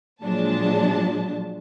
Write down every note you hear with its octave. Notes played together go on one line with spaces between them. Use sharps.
A#2 F3 F#3 G#3 D4 A5